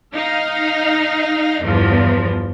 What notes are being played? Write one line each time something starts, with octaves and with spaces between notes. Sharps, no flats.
D#4 F5
G1 E2 F3